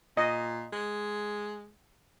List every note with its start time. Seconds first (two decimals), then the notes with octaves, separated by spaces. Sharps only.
0.17 A#2 D#5
0.72 G#3